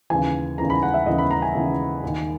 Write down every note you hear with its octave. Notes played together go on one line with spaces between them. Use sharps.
D#2 C#3 E3 G#5
D#2 C#3 E3 A#5
B5
F#5
E5
D#2 C#3 E3 D#5
B5
A#5
G#5
D#2 C#3 E3
D#2 D#3